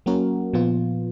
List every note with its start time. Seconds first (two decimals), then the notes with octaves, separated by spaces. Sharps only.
0.06 F#3 A#3 C#4 F#4 A#4
0.53 A#2 F3 B3 F4